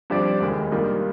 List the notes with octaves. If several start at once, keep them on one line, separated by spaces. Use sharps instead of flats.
G2 F3 C4 G4 D5
F1 D#2 D#3 G#3
G2 D#3 G3 A#3 F4